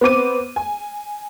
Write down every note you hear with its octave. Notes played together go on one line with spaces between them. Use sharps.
B3 C4 D6 D#7
G#5